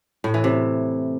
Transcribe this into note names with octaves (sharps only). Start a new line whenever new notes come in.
A2
E3
C3